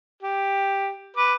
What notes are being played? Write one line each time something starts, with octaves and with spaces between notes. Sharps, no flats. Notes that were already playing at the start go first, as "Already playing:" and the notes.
G4
B4 D6